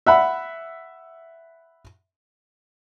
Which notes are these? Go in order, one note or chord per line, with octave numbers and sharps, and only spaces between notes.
E5 F#5 B5